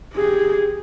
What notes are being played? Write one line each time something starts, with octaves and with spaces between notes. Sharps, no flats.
G4 G#4